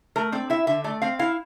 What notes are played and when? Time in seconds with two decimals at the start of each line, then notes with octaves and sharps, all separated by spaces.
0.16 A3 A#4
0.32 C4 D5
0.50 E4 E5
0.67 D3 E5
0.84 A3 D5
1.02 C4 F5
1.19 E4 F5